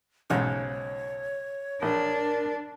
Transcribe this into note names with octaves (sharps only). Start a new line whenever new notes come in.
B1 G#2 C#3 C#5
A#1 D4 A#4